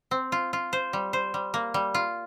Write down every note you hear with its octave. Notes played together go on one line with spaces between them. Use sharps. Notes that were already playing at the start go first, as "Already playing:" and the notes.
C4
F4
F4
C5
G3
C5
G3
A#3
G3
F4